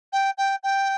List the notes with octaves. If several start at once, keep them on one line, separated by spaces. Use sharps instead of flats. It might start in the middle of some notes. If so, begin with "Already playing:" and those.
G5
G5
G5